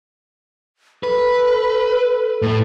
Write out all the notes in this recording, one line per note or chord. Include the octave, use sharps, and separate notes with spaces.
A4 B4
A2 A3